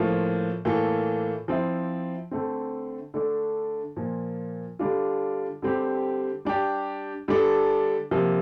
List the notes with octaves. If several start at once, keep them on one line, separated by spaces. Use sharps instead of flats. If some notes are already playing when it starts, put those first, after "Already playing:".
Already playing: A2 F3 A#3 F4
A2 E3 A#3 F4 A4
F3 C4 E4
D3 A3 C4
D3 A3 D4
A#2 F3 A#3
D3 G3 D4 F4
D3 G3 C4 G4
G3 D4 G4
D3 G3 D4 A4
C3 F3 A#3